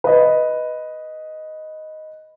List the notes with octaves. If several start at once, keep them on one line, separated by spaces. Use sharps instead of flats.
B4 D#5